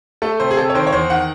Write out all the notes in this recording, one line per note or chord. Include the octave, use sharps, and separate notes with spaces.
A3 A4
C3 C5
G#4
C3 A4
C#5
D#3 C5
C#5
E2 C5
D#3 F#5